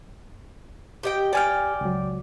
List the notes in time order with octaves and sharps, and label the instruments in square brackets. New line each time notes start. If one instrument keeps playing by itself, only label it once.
[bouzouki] G4 D#5 G5
[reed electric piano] G4 G#5 F6 [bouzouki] D5 E5 G5
[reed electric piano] C#2 F#3